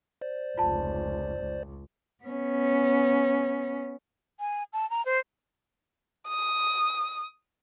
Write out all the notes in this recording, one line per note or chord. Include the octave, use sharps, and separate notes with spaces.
C5 D5
F1 C#2 F4 A5
C#2
B3 C#4
G#5
A5
A#5
C5
D#6